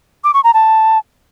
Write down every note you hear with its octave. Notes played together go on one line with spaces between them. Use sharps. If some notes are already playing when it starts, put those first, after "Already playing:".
D6
C#6
A#5
A5